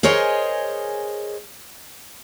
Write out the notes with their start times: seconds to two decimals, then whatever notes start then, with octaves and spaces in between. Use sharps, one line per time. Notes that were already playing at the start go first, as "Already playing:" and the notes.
0.03 G#4 A#4 C5 C#5 D#5 G#5